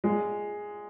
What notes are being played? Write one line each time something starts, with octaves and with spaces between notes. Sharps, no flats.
A#2 G#3